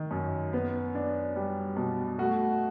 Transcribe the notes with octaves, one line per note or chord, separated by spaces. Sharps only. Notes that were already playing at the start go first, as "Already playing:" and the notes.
Already playing: D#3
F#2
B3
D4
G3
B2
A3 F#4